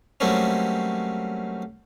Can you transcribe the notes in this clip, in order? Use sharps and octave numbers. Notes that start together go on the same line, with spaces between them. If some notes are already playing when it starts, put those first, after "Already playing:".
F#3 G3 A3 A#3 C4 C#4